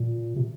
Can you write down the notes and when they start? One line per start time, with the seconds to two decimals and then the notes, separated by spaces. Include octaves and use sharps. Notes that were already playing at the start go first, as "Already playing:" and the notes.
Already playing: A#2
0.36 C3